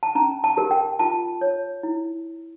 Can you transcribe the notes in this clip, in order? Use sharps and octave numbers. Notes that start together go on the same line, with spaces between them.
A5
C#4 A#5
A5
G4 A#4
G5
F4 A5
C#5
E4